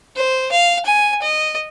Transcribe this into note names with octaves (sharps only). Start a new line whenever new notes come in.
C5
F5
G#5
D#5